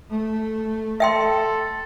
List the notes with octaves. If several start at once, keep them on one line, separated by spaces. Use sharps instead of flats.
A3
A4 E5 G5 C6